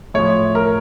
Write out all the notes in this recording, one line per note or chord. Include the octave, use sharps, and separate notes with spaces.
A2 F3 C#5
A#4